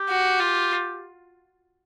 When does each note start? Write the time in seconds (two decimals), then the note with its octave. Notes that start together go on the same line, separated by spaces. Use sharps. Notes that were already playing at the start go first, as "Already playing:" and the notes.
Already playing: G4
0.08 F#4
0.40 F4